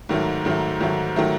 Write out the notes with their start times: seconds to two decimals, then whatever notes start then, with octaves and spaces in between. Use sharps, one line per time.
0.09 G#2 D#3 F#3 A3
0.45 G#2 D#3 F#3 A3
0.80 G#2 D#3 F#3 A3
1.16 D#3 F#3 A3